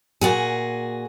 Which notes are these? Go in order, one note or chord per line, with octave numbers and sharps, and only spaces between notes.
A#2 F#4 G#4